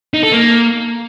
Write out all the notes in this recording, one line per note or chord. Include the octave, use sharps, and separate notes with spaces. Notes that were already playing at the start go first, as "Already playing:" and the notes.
D#4
A4
A#3